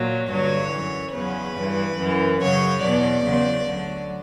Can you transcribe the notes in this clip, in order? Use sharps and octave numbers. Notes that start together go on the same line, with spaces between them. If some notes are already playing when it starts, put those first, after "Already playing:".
Already playing: A#2 F#3
G2 D3 F#3 C#5
F#2 E3
E2 C#3 F#3 B4
G2 E3
F#2 E3
F#2 C#3 F#3 C#5
E2 B2 F#3 D5
E2 C#3 F#3
D2 D3 F#3